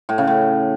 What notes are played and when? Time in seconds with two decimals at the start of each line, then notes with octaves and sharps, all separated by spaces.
0.09 A2
0.18 C#3
0.27 A2